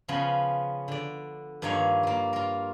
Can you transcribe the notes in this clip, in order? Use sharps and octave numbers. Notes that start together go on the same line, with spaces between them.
C#3 F3 B3 C#4 F4 B4
D3 D5
G2 D#3 F3 A#3 C#5 D#5
A#3 F4
F4 A#4